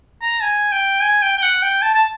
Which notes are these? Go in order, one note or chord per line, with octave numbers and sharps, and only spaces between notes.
A#5
G#5
G5
G#5
G5
G5
F#5
G5
A5
A5